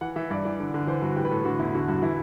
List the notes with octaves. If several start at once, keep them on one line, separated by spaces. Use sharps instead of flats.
E3 F#5
E3 E5
G2 D5
E3
D3
D3
E3 C5
G2 F#4
A2 G4
B4
A2 A4
D3 F#4
E2 E4
D3 F#4
G2 F#4
E3 E4